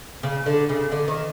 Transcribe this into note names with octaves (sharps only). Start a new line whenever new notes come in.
C#3
D3
C#3
D3
D#3